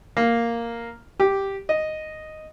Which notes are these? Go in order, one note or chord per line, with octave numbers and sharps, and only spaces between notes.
A#3
G4
D#5